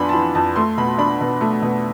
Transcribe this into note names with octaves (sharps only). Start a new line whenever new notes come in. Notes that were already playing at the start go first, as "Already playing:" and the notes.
Already playing: F2 B3 D4 G#5 B5 C6
A5
E3 B5
F2 A5
A3 C6
B2 B5
D4 B5
B2
A3
B2